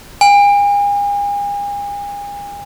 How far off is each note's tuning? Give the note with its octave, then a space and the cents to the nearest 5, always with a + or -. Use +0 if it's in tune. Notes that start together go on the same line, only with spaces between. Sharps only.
G#5 -40